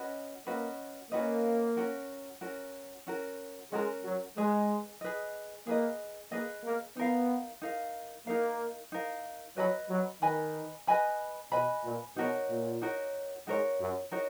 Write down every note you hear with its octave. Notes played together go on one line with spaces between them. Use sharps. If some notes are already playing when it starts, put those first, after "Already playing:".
Already playing: C#4 F#4 B4 D#5
A#3 C#4 F#4 B4 D#5
A#3 C#4 F#4 B4 D#5
C#4 F#4 A#4
C#4 F#4 A#4
C#4 F#4 A#4
G#3 C#4 F#4 A#4
F#3
G#3 G#4 B4 D#5
G#4 B4 D#5
A#3 G#4 B4 D#5
A#3 G#4 B4 D#5
A#3
B3 D#4 A#4 F5
D#4 A#4 F5
A#3 D#4 A#4 F5
D#4 A#4 F5
F#3 B4 D#5 G#5 B5
F#3
D#3 B4 D#5 G#5 B5
B4 D#5 G#5 B5
B2 B4 D#5 G#5 B5
A#2
B2 D#4 F#4 A#4 C#5
A#2
D#4 F#4 A#4 C#5
G#2 D#4 F#4 A#4 C#5
F#2
D#4 F#4 A#4 C#5